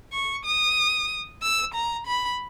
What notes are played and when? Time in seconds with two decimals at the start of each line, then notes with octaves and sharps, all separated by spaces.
0.13 C#6
0.45 D#6
1.42 E6
1.74 A#5
2.06 B5